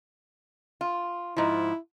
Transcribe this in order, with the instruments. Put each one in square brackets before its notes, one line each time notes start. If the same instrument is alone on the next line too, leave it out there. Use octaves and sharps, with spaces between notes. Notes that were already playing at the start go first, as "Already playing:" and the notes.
[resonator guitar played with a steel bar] F4
[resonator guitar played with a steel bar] G#2 F3 [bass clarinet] E4